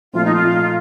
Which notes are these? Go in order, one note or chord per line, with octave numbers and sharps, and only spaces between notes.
A#2 F3 A3 C4 F4
D#4
F4